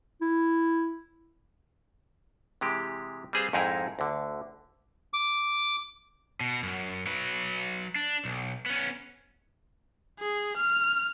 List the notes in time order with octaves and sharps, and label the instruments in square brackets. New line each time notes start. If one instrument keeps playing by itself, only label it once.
[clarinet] E4
[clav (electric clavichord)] C3 E3 G#3 G4
G3 C4 G#4 B4 C5 F5
F2 G#2 D#4 E4 G#4 A#4
D2 D3
[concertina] D6
[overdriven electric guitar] B2
F#2
F#3 B4
D4
B1
B3 C#4
[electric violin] G#4
F6